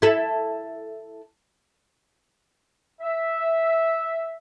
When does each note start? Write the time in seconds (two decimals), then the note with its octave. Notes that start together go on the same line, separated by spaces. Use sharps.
0.02 E4 A4
3.01 E5